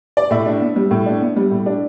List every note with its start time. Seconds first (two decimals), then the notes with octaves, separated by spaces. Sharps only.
0.17 D5
0.31 A2 E5
0.46 D4
0.61 B3
0.76 G3
0.91 A2
1.06 D4
1.21 B3
1.36 G3
1.51 A2
1.66 D4